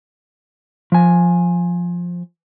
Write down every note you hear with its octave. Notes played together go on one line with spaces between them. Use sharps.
F3 G#5